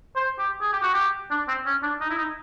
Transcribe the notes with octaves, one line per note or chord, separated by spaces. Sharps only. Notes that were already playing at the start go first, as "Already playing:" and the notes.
C5
G4
G#4
G4
F#4
G4
D4
C4
C#4
D4
D#4
E4
D#4